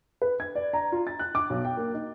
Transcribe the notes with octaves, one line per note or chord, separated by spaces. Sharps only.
B4
G#6
D5
A#5
F4
A6
F#6
D6
B1
G5
A#3
D#4